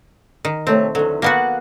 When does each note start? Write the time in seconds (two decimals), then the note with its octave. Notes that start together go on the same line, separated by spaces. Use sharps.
0.45 D#3
0.67 C3 A3 C4 C#5
0.95 E2 D3 F#3
1.22 A#3 B3 F#4 F5 F#5 G#5